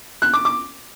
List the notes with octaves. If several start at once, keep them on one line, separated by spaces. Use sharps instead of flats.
F#6
D6
D6